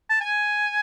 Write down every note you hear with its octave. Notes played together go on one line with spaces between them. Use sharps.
A5
G#5